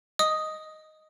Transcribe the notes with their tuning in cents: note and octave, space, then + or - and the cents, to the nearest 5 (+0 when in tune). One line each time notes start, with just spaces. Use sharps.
D#5 +0 D#6 +0